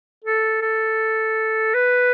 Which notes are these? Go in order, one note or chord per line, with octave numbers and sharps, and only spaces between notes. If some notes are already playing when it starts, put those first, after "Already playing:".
A4
A4
B4